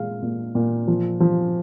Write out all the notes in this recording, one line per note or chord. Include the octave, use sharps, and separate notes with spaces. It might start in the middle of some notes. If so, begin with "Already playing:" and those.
Already playing: A#2 G#3 F5
A#2
A#2
F3
F3